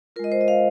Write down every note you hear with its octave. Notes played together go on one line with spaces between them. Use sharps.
G#3 F4 A#4 D#5
C5
D#5
F5